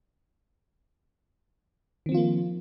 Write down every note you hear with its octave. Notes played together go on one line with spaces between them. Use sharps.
D#3 F3 A#3 C4 F4